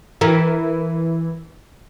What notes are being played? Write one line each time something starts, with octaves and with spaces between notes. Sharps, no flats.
E3 A#4